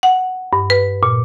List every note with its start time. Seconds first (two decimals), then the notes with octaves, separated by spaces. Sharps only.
0.03 F#5
0.53 G2
0.70 B4
1.03 A#2